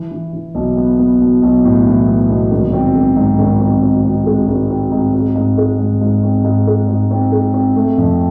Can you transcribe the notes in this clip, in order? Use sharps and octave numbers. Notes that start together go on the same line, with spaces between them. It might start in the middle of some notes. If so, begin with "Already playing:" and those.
Already playing: E3
E3
E3
B1
B3
B3
B1
B1
A2
E3
B3
B1
G#1
C4
G#1
G#2
G#1
C4
C4
C4
G#3
G#1
C4
G#2
C4
G#2
G#3
G#2
G#2
C4
G#2
G#3
G#2
C4
G#3
C4
A3
F2